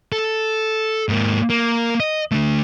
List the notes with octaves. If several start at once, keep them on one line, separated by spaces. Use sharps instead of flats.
A4
G#2 A#3
A#3
D#5
D3 A3